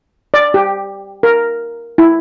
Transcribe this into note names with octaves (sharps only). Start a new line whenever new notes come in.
D5
G4
A#4
E4